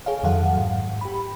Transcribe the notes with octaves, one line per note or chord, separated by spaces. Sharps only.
G#4 C#5 F5
F2 D#3 F#3 A4 F5 F#5
G#2 F#3
G4 B5